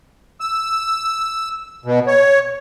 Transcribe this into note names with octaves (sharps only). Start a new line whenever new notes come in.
E6
B2
C#5